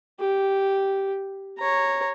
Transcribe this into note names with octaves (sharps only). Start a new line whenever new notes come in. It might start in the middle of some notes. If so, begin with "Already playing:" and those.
G4
C#5 A#5